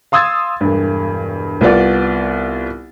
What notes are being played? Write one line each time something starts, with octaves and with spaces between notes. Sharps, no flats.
F5 C6 D#6 E6 G#6 A6
E1 G2
C2 B3 F4 D5